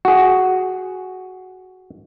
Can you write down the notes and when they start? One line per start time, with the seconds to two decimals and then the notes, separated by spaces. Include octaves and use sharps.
0.05 F#4 G#4